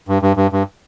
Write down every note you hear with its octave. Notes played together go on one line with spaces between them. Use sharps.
G2
G2
G2
G2